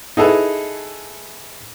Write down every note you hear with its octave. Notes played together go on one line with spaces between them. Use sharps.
D#4 E4 G#4 A4 B4